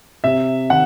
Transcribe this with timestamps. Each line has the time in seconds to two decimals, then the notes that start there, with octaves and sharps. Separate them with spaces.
0.24 C3 E5
0.70 D#3 F#5